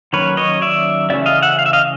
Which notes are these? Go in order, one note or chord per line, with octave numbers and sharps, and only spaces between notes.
D#3 F#3 A#3 C#4 B4 C#5
C#5 D#5
D5 E5
C#3 E3 A3 C#4 D5 E5
D#5 F5
E5 F#5
F5
E5
D#5 F5